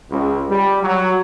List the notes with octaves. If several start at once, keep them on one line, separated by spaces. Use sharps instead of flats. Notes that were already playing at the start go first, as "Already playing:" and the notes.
C#2
G3
F#3